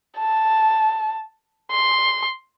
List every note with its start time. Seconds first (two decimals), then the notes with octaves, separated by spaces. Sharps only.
0.19 A5
1.72 C6